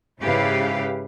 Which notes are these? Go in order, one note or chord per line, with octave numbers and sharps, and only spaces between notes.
G#2 C#3 E4 G4 B4 F5